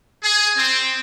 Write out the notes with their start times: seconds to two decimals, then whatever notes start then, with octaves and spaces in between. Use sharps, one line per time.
0.23 G#4
0.56 C4